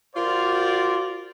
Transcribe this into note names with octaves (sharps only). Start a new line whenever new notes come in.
F4 F#4 A#4 C5 D5